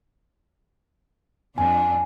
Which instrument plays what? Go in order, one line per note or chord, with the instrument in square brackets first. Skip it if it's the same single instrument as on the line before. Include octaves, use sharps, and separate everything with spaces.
[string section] F2 D4 [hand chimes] G#5